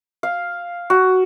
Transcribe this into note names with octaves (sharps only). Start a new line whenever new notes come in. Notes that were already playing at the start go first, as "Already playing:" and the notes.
F5
F#4